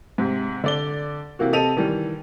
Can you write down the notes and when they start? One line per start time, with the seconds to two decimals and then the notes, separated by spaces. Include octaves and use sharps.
0.18 G#2 C3
0.64 D3 D5 G7
1.39 C3 E3 A#3 F#4
1.53 C3 A4 D#5 D#7 F7
1.77 D#3 E3 G3